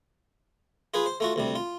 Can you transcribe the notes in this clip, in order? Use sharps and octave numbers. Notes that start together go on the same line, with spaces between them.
F4 G#4 B4
C5
A3 F4 F#4
D2 C3 G3
F4